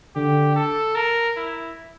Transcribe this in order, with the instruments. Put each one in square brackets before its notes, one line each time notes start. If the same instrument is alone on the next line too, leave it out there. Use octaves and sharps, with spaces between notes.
[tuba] D3 [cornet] G4
[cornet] A4
A#4
E4